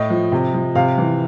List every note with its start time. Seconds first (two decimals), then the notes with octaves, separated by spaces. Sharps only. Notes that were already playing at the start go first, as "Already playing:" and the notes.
Already playing: A2 D#5
0.10 F3
0.32 C3
0.54 F3
0.75 C3 F5
0.98 E3